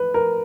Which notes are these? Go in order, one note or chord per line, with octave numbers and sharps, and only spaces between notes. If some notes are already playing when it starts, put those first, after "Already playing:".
Already playing: B4
A#4